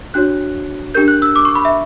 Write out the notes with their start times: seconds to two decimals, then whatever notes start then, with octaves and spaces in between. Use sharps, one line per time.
0.14 D4 F#4 C#5 F#6
0.94 D4 G4 A#4 G6
1.08 F#6
1.22 E6
1.36 D6
1.45 C#6
1.55 B5
1.65 E5